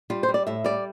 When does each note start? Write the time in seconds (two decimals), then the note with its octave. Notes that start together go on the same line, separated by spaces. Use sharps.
0.10 G3 F4
0.23 C5
0.28 G3
0.34 D5
0.47 A2 E5
0.64 G3 D5